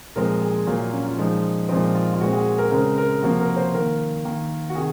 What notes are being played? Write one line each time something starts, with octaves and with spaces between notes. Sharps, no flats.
A#2 F3 G#3 C4 A#4
G#4
A#2 F#3 A#3 A#4
F4
C#4
F4
A#2 F3 G#3 D#4
A#2 F3 G#3 C4 D#4
F4
F4
A#2 G#3 C4 F#4
G#4
A#4
C#3 G#3 C4 A#4
A#4
C3 F3 A#3 F#4
A#4
C5
D#3 A#3 A#4
D#3 A#3
F#4
C3 D#3 G#4